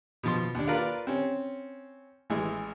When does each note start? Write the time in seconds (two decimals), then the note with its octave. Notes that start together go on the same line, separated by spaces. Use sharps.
0.23 B2 F3 C6
0.55 D#2 D4
0.68 F4 A#4 B4 D5 F5
1.07 C4 C#4
2.30 A1 E3 G#3